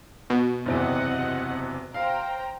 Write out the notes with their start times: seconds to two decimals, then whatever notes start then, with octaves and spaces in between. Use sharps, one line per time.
0.30 B2
0.66 F#1 E2 C3 C4 D#5 F#5
1.94 C5 F5 G5 A#5